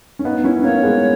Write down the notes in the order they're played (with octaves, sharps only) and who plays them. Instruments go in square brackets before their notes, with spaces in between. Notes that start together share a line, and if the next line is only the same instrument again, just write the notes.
[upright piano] C#4
B3 D#4
C#4 E4
[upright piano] A#3 C#4 [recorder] C#5
[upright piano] G#3 B3